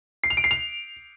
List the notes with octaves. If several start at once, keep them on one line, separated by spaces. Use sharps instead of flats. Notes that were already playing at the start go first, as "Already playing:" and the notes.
C7
F7
D7
C7
F7